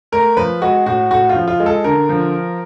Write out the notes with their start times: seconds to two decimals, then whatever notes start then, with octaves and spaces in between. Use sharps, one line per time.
0.12 A3 A#4
0.37 F3 B4
0.62 G#3 F#4
0.86 A2 F#4
1.11 A2 F#4
1.29 F4
1.35 F3
1.48 F4
1.60 G#3
1.66 A4
1.84 D3 A#4
2.09 F3